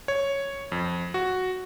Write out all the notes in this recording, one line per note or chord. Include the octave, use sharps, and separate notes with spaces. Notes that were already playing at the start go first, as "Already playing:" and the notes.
C#5
F2
F#4